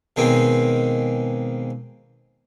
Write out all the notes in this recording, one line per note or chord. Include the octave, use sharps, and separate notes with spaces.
B2 D#3 G#3 A#3 C4